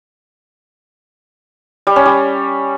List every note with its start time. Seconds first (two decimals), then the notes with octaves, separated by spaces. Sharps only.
1.87 G3
1.96 C#4
2.05 G3